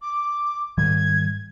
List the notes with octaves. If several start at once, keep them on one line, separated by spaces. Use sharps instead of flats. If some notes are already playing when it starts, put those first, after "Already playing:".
D6
G#2 D#3 G3 G#6